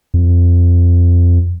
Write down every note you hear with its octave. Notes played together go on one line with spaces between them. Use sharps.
F2